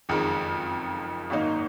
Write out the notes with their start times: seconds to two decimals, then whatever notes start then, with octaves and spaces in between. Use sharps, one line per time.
0.09 F#1 F2 D#3 G#3
1.30 G#1 F#2 D#3 A#3 D#4